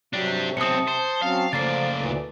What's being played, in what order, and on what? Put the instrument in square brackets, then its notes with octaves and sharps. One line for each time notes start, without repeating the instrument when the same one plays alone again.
[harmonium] C3 [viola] F#3 [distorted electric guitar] D4 G4
[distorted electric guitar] B1 C4 [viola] A5 [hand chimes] D#6 C#7
[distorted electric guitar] C5
[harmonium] F#3 C4 C#4 [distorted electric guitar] F5
[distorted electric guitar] C#3 A#3 [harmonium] F3 [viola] A3 D5 [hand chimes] A6 C7
[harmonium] D2 A#2 E3